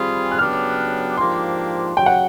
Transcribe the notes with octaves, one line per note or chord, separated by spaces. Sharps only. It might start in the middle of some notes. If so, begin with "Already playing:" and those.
Already playing: G3 C4 F4 G#4 B5
F#6
C#3 F#3 B3 D4 G4 F6
G#2 F3 A#3 D4 G4 C6
C#3 F#3 G5
F#5